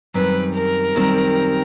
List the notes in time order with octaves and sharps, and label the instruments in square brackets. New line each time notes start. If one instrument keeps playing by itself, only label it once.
[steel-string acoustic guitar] F#2 D#3 G3 C4 [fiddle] B4
[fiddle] A#4
[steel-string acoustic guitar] F#2 D#3 G3 C4